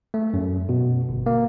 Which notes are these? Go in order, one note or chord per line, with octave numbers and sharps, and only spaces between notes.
A3
F#2
B2
G1
A#3